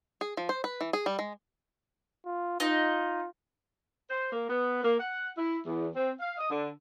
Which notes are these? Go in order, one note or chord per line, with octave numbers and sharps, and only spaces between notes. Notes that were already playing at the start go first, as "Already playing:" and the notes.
G#4
F3
C5
B4
E3
G#4
G3
G#3
F4
D#4 F4 D#5
C5
A#3
B3
A#3
F#5
E4
E2
C4
F5
D#5
D3